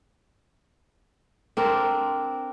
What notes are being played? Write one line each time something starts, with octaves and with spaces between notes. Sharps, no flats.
C4 D4 A#4